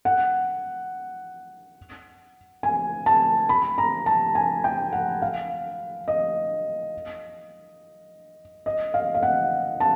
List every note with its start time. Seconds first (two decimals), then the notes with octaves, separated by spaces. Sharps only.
0.05 F#5
2.63 G#5
3.06 A5
3.49 B5
3.78 A#5
4.06 A5
4.35 G#5
4.64 G5
4.93 F#5
5.22 F5
6.08 D#5
8.66 D#5
8.94 F5
9.15 F5
9.23 F#5
9.80 A5